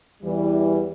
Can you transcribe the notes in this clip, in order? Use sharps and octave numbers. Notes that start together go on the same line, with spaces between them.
E2 E3 G3